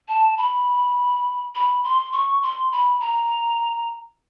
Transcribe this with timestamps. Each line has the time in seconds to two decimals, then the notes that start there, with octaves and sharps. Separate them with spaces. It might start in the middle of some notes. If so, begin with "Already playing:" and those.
0.08 A5
0.38 B5
1.55 B5
1.84 C6
2.13 C#6
2.43 C6
2.72 B5
3.00 A#5